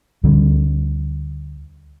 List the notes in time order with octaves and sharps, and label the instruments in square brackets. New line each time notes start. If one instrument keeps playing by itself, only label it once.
[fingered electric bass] D2 D3 G3